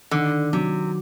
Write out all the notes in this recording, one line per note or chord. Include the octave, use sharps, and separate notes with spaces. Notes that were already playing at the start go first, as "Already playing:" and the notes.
D3 D#3
C3 F#3